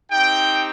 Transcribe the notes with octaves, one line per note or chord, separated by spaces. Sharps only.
C4 D#4 G4 G5